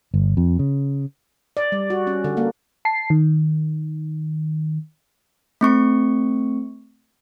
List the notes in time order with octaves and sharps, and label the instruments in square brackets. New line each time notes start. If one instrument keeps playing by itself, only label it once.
[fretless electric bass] G1
F2
C#3
[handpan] D5
G3
F#4
C#4
D3
A#3
[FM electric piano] A5 C7
D#3
[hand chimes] A3 C4 C#6 C#7